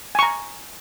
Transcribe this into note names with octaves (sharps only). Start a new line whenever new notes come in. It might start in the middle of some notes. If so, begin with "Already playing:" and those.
G#5 A#5 C#6